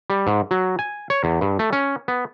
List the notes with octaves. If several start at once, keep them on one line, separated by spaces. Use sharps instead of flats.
G3
G#2
F#3
G#5
C#5
E2
G2
A3
C#4
B3